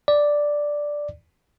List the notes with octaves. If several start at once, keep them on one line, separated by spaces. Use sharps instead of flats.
D5